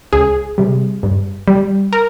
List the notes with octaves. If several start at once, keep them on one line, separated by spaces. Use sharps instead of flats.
C#2 G#4
C3 G3
G2
G3
A#4